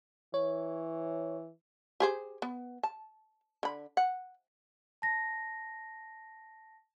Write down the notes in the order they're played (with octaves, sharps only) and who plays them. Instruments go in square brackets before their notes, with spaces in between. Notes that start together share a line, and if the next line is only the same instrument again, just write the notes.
[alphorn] E3 [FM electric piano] C#5
[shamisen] G4 G#4 C5
B3
A5
D3 B5
F#5
[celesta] A5 A#6